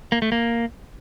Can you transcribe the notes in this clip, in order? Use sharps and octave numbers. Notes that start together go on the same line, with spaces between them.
A#3
A3
A#3